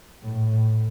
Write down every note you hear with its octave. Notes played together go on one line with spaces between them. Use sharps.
A2